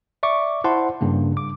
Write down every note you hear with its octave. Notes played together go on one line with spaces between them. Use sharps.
D5 E5 C#6 D6
E4 C5 F#5 A5 C6
G2 C#3 A#3
D6